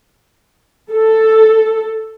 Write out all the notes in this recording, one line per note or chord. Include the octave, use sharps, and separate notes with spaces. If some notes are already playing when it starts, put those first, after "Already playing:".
A4